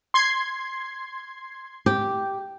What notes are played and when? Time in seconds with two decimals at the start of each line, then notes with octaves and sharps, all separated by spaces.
0.14 C6 G#6 C7
1.86 G4